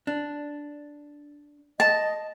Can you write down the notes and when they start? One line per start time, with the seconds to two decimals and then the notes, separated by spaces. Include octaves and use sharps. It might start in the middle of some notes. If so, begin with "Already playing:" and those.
0.07 D4
1.80 D#5 A5